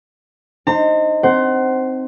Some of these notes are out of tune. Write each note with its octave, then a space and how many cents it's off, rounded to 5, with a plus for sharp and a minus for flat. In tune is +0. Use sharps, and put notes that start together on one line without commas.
D#4 +0 C5 +0 A#5 -45
C4 -5 C5 +0 F#5 +30